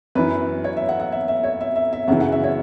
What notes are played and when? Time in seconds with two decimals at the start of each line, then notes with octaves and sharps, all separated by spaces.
0.15 F#2 E3 B4
0.64 C#5
0.77 E5
0.89 F#5
1.00 F#5
1.12 E5
1.28 E5
1.43 C#5
1.61 E5
1.76 E5
1.93 E5
2.08 F#2 C#3 E3 F#5
2.20 F#5
2.32 E5
2.43 C#5